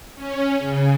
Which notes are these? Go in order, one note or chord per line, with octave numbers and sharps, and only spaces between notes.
C#4
C#3